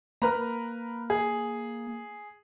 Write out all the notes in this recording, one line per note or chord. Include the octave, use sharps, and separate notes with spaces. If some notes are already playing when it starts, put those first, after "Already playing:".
A#3 A#4 B4 A#5
G#4